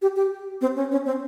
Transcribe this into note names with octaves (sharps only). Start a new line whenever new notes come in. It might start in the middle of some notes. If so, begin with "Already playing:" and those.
G4
G4
C4
C#4
C#4
C4